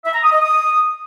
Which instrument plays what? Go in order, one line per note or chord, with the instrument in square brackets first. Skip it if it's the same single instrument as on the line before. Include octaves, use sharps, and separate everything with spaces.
[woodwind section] E5
A#5
D#6
D#5
D#6